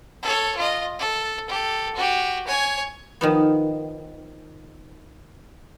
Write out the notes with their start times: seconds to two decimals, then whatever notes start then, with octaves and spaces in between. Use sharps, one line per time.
0.23 A4 C#5
0.57 F4 D#5
0.99 A4
1.50 G4 A4
1.95 F#4 G4
2.47 C#5 G#5
3.21 D#3 F3 B3